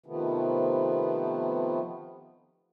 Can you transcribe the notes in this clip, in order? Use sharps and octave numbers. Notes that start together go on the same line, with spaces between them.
C3 D#3 F3 A3 B3